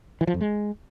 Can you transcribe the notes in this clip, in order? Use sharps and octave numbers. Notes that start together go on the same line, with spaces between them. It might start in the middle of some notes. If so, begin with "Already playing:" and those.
E3
F3
F2
G#3